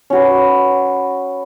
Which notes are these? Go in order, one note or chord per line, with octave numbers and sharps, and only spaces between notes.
C#4 F#4 B4